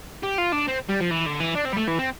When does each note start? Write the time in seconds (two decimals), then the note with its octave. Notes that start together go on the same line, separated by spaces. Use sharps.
0.23 G4
0.38 F4
0.52 D4
0.68 C4
0.89 G3
1.01 F3
1.11 E3
1.26 D3
1.40 E3
1.55 D4
1.65 C4
1.73 G3
1.77 A3
1.88 E3
1.99 C4